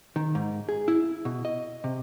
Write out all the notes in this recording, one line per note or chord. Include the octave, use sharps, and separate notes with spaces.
D#3
G#2
G#4
E4
B2
D#5
C3